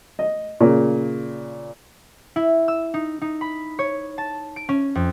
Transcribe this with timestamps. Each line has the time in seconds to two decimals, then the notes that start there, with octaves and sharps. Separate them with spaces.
0.19 D#5
0.60 A#2 C#3
2.36 E4
2.68 E6
2.94 D#4
3.22 D#4
3.41 B5
3.79 C#5
4.18 A5
4.56 D7
4.69 C#4
4.95 F2